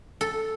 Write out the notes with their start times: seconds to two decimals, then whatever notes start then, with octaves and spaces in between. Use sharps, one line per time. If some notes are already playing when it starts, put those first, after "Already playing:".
0.21 A4